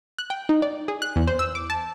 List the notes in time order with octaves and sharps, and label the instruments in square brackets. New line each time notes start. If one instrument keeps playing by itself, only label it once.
[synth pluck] F#6
G5
D#4
D5
G#4
F#6
E2
C5
E6
D6
A5